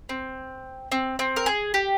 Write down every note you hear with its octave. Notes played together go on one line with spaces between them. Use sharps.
C4
C4
C4
A#4
G#4
G4